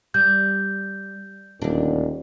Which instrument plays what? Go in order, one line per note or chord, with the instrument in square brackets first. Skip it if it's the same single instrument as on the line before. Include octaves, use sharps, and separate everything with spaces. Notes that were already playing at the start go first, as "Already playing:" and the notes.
[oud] G3 [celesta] G6
[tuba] D#1 [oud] D2 D4